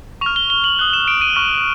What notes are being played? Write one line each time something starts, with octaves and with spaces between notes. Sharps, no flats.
C#6 F6 F7
G7
G7
F#7
D#6 F#6 F#7
E7
D7
D#7
C#6 F6